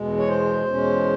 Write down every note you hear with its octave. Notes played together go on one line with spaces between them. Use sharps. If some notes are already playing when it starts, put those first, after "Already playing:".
Already playing: E2 B2 G#3
C#5
C5
E2 B2 G#3 C#4